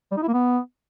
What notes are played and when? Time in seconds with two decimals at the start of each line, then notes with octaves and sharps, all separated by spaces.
0.12 G3
0.17 D#4
0.23 E4
0.28 A#3
0.34 B3